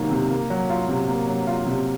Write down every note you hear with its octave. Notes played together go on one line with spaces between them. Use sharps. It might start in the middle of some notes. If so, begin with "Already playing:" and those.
Already playing: C3 D#3 F#3 A#3
C3
A#3
F#3
F4
C3
A#3
F#3
F4
C3